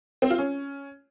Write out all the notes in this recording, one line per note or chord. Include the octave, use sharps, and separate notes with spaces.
C4
F4
C#4